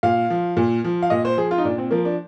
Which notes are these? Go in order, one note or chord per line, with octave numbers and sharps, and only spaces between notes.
A#2 F5
F3
A#2
F3
F5
A#2 D#5
C5
F3 G#4
F4
D#4
A#2 D4
C4
F3 A#3
D4